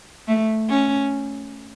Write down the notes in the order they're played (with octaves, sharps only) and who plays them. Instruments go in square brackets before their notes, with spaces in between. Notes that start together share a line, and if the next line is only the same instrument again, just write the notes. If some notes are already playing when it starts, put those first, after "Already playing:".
[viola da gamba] A3
C#4